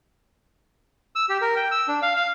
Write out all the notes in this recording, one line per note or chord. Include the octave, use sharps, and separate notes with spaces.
E6
G4
A#4
G5
E6
D4
F5
F5